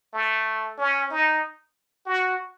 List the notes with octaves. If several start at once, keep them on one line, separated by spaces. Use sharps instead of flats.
A3
C#4
D#4
F#4